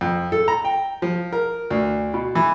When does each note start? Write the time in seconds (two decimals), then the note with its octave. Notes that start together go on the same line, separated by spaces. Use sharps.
0.01 F2
0.32 A4
0.48 A#5
0.65 G5
1.02 F3
1.33 A#4
1.70 D2
2.14 B2
2.35 E3